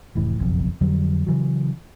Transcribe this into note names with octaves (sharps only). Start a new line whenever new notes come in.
F1 A2 E3
F#1 B1 F2
F2 D3 F#3 G3
C#3 E3 F#3